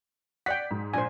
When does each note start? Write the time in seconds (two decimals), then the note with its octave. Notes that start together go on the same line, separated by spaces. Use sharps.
0.46 D5 F#5 G5 B6
0.71 G#2
0.93 A#1 C5 G#5